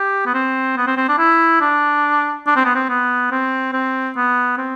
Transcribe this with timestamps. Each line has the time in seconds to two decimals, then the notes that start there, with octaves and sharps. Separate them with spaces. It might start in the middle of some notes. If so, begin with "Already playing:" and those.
Already playing: G4
0.26 B3
0.34 C4
0.77 B3
0.87 C4
0.97 C4
1.09 D4
1.19 E4
1.61 D4
2.47 D4
2.56 C4
2.65 B3
2.75 C4
2.89 B3
3.31 C4
3.73 C4
4.16 B3
4.58 C4